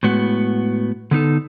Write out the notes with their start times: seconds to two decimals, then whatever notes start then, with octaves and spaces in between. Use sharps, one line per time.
0.03 A2 G#3 B3 F#4
1.11 D3 B3 D#4 A4